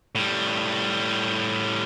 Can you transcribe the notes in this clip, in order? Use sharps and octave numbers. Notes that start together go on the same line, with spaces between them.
A2 G3